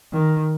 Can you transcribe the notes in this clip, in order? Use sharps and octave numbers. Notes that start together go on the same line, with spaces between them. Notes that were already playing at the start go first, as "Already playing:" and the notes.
D#3